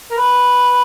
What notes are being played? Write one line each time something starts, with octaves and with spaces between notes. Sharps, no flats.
A#4
B4